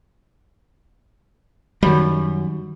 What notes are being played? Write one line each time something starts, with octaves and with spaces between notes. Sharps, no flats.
F#2 D#3 G3 B5